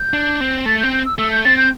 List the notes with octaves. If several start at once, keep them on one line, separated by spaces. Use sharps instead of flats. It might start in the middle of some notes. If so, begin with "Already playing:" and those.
Already playing: G6
D4
C4
A3 A6
C4 G6
G6
E6
A3 E6
G6
C4 A6
G6